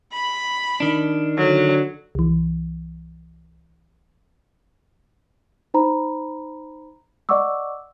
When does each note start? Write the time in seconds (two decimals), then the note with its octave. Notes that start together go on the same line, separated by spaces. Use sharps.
0.13 B5
0.80 D#3 D4
1.38 D3 F#3
2.15 C2 E3
5.74 D#4 C5 A#5 B5
7.29 D5 D#5 F#5 C#6 D6 E6